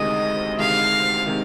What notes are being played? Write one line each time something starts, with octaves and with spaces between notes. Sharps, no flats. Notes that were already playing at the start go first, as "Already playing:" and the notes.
Already playing: D2 C3 D#3 G#3 D#5
D2 C3 D#3 G#3 F5
C3 D#3 G#3